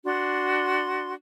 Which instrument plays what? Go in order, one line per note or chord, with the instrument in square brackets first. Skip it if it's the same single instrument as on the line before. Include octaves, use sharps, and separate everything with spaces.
[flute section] D4 F#4 C6